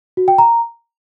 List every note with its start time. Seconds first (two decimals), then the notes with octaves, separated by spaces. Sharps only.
0.17 F#4
0.28 G5
0.38 A#5